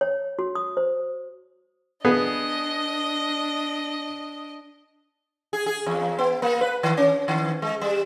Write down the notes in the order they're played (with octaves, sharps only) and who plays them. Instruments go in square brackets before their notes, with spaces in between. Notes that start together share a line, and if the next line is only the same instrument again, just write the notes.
[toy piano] C#5
F#4
D#6
C5
[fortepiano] B3 G#4 [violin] D4 D#5
[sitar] G#4
G#4
E2
B3
A#3
B4
D#3
C#4
D#3
G#3
G3